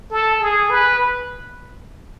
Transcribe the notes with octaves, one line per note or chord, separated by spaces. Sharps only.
A4
G#4
B4